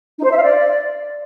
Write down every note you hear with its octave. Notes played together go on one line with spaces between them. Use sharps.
D#4
C5
E5
F5
D5